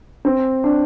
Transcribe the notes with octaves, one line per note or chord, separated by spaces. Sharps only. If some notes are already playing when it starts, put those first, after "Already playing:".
C4
D4